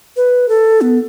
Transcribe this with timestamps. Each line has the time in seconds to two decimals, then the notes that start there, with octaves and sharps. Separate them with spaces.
0.17 B4
0.49 A4
0.81 B3